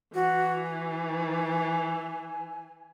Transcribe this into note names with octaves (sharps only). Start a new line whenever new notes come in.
E3 F#4
G#5